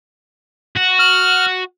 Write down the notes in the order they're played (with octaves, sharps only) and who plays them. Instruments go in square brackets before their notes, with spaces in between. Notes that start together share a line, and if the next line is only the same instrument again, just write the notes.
[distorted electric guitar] F#4
[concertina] F6